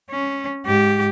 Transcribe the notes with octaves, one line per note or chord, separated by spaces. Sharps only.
C#4
G#2 G4